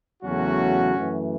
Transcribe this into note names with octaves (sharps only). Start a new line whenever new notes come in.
E2 C#3 F#3 A3 C#4 F#4
F#2 E3 A3